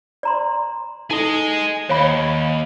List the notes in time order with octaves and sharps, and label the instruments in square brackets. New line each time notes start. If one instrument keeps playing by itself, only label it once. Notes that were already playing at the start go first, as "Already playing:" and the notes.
[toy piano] D5 A#5 C6
[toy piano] D#4 A4 [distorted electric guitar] G#4 D#5
[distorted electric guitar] D#2 [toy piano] C#5 F5 B5